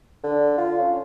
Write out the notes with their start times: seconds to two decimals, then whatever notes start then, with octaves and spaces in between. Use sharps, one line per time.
0.23 D3
0.58 F4
0.79 C#4